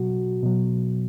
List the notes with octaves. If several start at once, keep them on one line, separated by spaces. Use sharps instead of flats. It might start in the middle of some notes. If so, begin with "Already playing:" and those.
Already playing: B2 F#3 F#4
B2 F#3